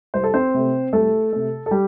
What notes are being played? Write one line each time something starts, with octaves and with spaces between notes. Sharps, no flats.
C2 C5
A4
C4 C5
C3 A3
C2 A3 A4
C3 A3
A4
G3 G4